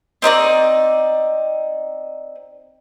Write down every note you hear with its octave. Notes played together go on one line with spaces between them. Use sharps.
C4 D#4 C#5 D5